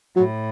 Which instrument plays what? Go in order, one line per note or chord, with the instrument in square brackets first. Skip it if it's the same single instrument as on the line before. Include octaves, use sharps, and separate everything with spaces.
[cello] A2 [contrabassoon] F#3